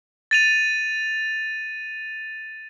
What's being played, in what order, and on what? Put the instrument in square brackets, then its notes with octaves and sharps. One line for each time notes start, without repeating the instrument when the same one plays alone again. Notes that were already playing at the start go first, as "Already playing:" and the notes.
[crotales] A6 D#7 F7